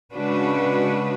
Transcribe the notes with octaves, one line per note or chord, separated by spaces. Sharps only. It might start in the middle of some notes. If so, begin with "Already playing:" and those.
C#3 G#3 D4 F#4 B4